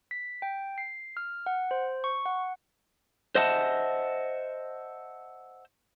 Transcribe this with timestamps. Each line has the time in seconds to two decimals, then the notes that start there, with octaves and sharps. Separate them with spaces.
0.11 B6
0.42 G5
0.78 C7
1.17 F6
1.46 F#5
1.71 C5
2.04 C#6
2.26 F#5
3.35 C5 D#5 E5 F#5 A5